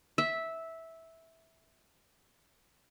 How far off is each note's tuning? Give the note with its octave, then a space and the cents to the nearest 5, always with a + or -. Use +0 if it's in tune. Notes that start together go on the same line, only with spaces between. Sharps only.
E5 -10